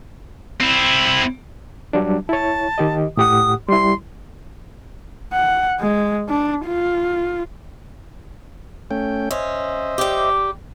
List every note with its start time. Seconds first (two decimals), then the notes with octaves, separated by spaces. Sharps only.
0.61 C4 E4
1.93 F#3 G3 D4
2.29 E4 C#5 A5
2.78 D#3 G4 D#5
3.17 A2 G4 F#5 D#6
3.68 G3 E4 C6
5.33 F#5
5.80 G#3
6.29 D4
6.66 F4
8.91 A3 C#4 G5
9.31 C#4 C5 D#5 E5
9.98 G3 G4